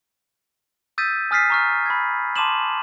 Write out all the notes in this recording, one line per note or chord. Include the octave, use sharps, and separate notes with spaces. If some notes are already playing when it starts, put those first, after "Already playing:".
D#6 E6 G6 A6 B6 D#7
G#5 D#6 F6 A6 B6 C7
A#5 C#6 F6
B5 G#6
A5 C6 D6 D#7 E7 F#7